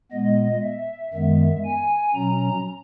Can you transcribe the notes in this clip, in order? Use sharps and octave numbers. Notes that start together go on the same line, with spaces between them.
A#2 G#3 B3 D#5
E5
F#2 D#3 G#3 B3 E5
G#5
B2 F#3 C#4 A#5